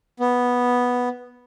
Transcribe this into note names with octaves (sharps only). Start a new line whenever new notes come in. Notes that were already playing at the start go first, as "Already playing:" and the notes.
B3